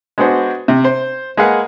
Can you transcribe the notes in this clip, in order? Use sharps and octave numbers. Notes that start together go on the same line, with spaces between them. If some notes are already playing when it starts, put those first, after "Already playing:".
G#3 B3 D4 F#4 C5
C3
C5
G#3 A#3 G#4 B4 F5 F#5